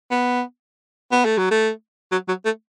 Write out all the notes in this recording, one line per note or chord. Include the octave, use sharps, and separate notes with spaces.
B3
B3
A3
F#3
A3
F#3
F#3
A3